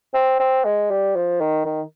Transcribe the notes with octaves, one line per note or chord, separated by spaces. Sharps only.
C4
C4
G#3
G3
F3
D#3
D#3